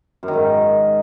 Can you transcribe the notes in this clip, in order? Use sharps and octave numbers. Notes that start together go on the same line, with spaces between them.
F#2
D#3
G#2